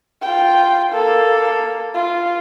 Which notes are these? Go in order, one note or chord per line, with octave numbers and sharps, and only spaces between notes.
F4 G5
A#3 A4
F4